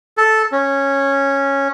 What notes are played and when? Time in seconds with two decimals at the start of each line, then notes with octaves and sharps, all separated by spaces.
0.18 A4
0.52 C#4